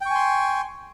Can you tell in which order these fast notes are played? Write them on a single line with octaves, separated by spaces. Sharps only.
G5 C#6 G#5 C6